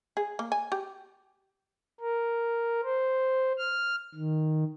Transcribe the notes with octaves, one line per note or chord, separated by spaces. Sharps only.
G#4
A#3
G#5
G4
A#4
C5
F6
D#3